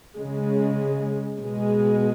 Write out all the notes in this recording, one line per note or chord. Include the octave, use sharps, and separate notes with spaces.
C#3 G#3
B2 G#3